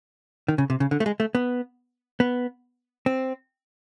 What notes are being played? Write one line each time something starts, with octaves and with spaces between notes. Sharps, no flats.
D#3
C#3
C3
C#3
D3
A3
G#3
A3
B3
B3
C4